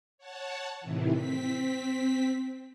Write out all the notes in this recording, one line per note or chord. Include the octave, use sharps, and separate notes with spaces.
C#5 F#5 A5
A2 C3 D#3 E3
C4 B6